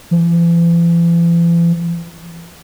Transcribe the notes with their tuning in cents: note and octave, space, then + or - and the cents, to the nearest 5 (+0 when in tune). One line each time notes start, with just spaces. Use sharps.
E3 +45